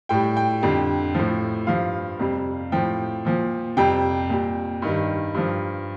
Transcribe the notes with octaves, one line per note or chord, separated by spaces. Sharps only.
A2 G3 G5
G5
F2 D3 G3
A2 F3
G2 F3 F5
F2 C3 G3
A2 F3 G5
A#2 F3
F2 C3 G3 G5
A#2 G3
G2 D#3 G3
G2 F3